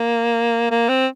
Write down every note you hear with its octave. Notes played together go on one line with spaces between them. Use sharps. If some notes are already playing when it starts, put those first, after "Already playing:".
Already playing: A#3
A#3
C4